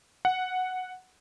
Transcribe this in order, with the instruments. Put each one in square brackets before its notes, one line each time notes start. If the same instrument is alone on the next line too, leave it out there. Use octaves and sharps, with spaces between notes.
[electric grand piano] F#5